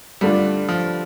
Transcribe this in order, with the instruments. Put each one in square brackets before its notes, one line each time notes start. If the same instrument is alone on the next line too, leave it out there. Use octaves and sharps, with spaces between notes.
[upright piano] G2 D3 A3 D4 F4 [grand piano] G3
[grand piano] F3